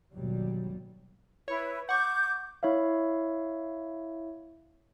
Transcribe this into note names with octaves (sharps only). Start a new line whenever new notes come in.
G1 D#2 B2 F#3 G3
E4 B4 C#5
F#5 C#6 D6 G6
E4 C#5 E5 F5